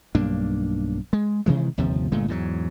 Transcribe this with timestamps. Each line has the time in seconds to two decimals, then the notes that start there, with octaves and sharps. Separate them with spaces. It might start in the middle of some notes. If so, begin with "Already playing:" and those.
0.15 B1 G2 A#3 D4
1.13 G#3
1.46 C3 D#3 E3 G#3
1.78 G1 D#2 C3 F3
2.12 G1 A#2 G#3 A3
2.28 E2 G#2 C#3 F#3